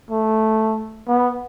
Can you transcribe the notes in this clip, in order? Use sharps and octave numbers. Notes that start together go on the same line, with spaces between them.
A3
B3